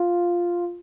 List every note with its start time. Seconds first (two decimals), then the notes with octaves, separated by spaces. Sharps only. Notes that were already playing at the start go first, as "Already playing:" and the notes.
Already playing: F4